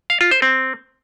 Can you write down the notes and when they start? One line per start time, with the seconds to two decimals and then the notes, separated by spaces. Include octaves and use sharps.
0.10 F5
0.21 F4
0.31 C5
0.42 C4